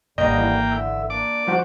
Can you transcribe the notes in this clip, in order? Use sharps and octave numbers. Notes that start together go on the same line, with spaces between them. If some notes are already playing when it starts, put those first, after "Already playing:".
D#1 G#1 G2 D3 G3 A#3 D#5 G5
E3
D3 E5 E6
A#3 D4 D5 D6
F3 F#4 C5 G6